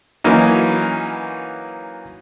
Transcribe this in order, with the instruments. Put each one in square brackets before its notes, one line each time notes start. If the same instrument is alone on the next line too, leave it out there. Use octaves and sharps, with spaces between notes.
[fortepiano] E3 F#3 A#3 C#4 D#4